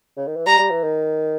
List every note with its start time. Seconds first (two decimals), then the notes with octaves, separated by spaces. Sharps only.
0.17 C#3
0.27 D#3
0.36 E3
0.47 G3 A#5
0.59 G3
0.70 E3
0.83 D#3